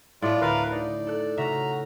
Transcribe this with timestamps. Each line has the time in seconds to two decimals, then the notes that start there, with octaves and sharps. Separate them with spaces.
0.22 A2 A3 F4 D5
0.41 D2 A#4 B4 F5
0.72 D#4 D5
1.07 A4 F#6
1.38 C#3 F#4 E5 A#5 F6